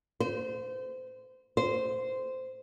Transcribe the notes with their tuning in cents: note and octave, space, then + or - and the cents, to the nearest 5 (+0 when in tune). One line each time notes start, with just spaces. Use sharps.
C5 -25
C5 -10